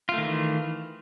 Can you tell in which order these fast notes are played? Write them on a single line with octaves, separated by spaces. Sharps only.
F4 A3 D#3 E3